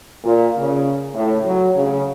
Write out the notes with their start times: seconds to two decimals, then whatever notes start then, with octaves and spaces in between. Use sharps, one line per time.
0.24 A#2
0.57 C#3
1.14 A2
1.45 F#3
1.76 C#3